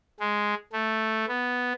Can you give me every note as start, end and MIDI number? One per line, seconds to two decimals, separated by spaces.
0.20 0.54 56
0.72 1.25 57
1.28 1.73 59